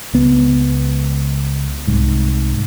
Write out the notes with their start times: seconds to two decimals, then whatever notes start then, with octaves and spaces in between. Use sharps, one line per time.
0.14 C#2 B3
1.87 C2 G#2